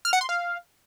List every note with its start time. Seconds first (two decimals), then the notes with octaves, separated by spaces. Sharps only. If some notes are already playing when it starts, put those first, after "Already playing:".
0.05 F6
0.13 F#5
0.21 C6
0.29 F5